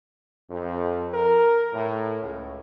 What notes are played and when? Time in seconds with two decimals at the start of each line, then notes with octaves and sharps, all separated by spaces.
0.51 F2
1.13 A#4
1.73 A2
2.23 C#2